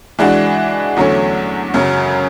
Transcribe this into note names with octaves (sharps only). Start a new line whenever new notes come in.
E3 G#3 D4 F#4
E2 D3 F#3 A3 C#4
F#2 C#3 F#3